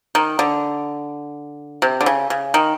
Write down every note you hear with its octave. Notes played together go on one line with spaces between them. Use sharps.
D#3
D3
C3
D3
C#3
C#3
D#3